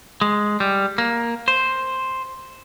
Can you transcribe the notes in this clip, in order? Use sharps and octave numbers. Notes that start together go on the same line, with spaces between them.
G#3
G3
A#3
C5